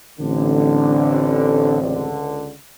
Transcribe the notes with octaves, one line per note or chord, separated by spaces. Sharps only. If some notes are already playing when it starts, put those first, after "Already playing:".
A1 D3 C4
C#2 D3